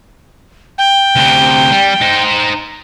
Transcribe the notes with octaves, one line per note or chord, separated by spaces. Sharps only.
G5
D2 C3
G3
D#4 C5